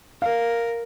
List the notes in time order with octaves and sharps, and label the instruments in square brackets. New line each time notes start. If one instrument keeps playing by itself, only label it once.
[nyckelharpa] A#4 [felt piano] F5